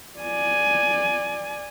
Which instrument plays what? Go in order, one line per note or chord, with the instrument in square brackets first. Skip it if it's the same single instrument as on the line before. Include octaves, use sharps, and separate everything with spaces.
[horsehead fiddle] D5 G#5